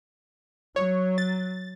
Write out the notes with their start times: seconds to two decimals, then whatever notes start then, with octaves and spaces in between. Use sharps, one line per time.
0.76 F#3 C#5
1.18 A6